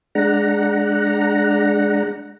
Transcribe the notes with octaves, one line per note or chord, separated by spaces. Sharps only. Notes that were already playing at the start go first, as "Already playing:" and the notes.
G#3 D4 F#5 A#5